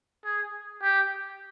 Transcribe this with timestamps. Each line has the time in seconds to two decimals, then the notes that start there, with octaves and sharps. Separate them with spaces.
0.25 G#4
0.82 G4